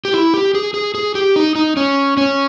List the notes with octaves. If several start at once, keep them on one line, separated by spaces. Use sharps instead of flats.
G4
E4
G4
G#4
G#4
G#4
G4
D#4
D#4
C#4
C#4